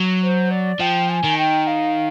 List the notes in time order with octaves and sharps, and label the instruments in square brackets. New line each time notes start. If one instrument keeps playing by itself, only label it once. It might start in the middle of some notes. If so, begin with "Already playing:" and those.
Already playing: [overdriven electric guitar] F#3
[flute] C5
D5
[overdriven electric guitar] F3 [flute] G5
[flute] G#5
[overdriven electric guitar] D#3
[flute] G5
F5